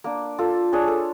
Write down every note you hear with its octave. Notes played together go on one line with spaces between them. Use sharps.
A#3 D4
F4 A4
D4 G#4 C#5
A4